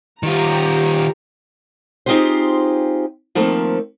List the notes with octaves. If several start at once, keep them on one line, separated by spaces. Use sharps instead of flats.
D#3 F4 G4 A#5
C4 D#4 F4 G4 G#4 C5
D#3 F3 A3 A#3 C4 A4